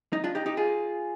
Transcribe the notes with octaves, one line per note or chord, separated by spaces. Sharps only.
D#4
D4 F4
D#4 G4
D#4 G4
F4 G#4